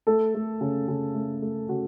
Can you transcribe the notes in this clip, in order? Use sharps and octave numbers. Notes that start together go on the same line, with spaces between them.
A3 A4
A3
C#3
C#3
A3
A3
C#3 F#4